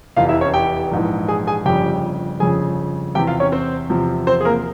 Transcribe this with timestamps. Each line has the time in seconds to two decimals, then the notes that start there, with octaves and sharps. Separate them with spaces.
0.16 F1 E2 E3 F4 F5
0.29 E4 E5
0.41 C#4 C#5
0.54 G4 G5
0.91 A#1 G#2 E3
1.28 G#4 G#5
1.47 G#4 G#5
1.65 G1 F2 C#3 G4 G5
2.40 G1 F2 C#3 G#4 G#5
3.15 E2 C3 E3 G4 G5
3.27 F4 F5
3.40 C#4 C#5
3.52 C4 C5
3.89 E2 C3 F3
4.27 C4 C5
4.41 G#4
4.45 A#3 A#4